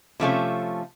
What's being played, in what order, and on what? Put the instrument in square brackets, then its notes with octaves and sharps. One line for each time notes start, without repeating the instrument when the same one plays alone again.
[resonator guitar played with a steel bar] C3 F3 A3 C#4